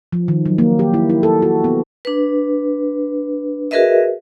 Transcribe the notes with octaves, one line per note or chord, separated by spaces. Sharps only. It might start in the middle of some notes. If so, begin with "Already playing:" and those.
F3
D#3
F#3
A#3
G4
E4
E4
A4
F#4
B3
D4 B4
F#4 G#4 A#4 B4 D#5 E5